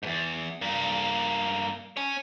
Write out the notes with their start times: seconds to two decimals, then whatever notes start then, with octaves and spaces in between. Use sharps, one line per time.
0.03 E2 G#2
0.61 G2 A#3
1.97 C#5 G#5